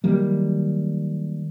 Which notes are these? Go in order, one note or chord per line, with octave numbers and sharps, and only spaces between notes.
D#3 F#3 G3 A#3